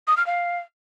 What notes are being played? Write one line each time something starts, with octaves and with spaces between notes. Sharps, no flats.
D#6
F6
F5